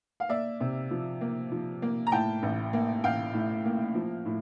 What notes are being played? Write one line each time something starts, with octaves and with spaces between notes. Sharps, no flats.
F5
A#3 D5 E5
C3
F3
A#3
F3
A#3
A#5
A2 G5 A5
A1
A#3
A1 F5 G5
A2
A#3
F3
A2